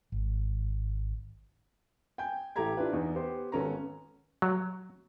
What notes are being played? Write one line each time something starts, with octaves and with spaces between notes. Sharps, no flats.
G#1
G5 G#5 G6
A1 E4 G4 A4 A#5 G#6
D4 E4 F4 B4
E2 D#4
B3 G4 C5
G#1 B3 C#4 A4 A#5
F#3